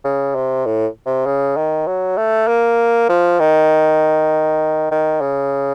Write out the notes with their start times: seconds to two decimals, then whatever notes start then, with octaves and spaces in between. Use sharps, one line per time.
0.05 C#3
0.35 C3
0.66 A2
1.06 C3
1.26 C#3
1.57 D#3
1.87 F#3
2.17 A3
2.48 A#3
3.09 F3
3.40 D#3
4.91 D#3
5.21 C#3